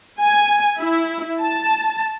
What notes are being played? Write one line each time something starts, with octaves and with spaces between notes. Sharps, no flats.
G#5
E4
A5